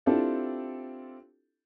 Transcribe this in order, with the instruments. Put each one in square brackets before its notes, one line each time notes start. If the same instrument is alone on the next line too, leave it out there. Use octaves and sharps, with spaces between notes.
[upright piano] C4 D4 E4 F4 G4 A4